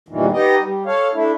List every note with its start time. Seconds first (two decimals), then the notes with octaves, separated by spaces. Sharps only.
0.09 E2 G2 A#2 D#3 E3
0.32 B3 D#4 G4 D#5
0.59 G3
0.86 A4 C#5 F5
1.13 A3 D4 E4